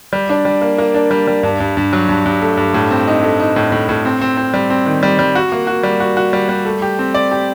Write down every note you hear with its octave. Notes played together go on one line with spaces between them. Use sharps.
G3
D4
G3
A#3
A#3
D4
G3
G3
G2
G2
G2
F#3
G2
G2
A3
G2
A2
C4
D#4
A3
D#4
A2
A2
A2
C4
C4
C4
G3
C4
D#3
G3
G3
F#4
A#3
F#4
G3
F#4
F#4
G3
G3
A3
G4
C4
D5
G4